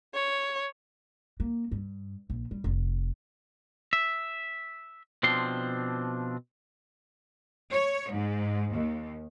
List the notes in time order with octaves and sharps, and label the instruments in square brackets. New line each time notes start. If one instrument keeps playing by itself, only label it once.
[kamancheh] C#5
[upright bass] A#3
G2
A#1
G3
F1
[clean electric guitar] E5
B2 F3 C4 D4 C6
[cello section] C#5
G#2
D#2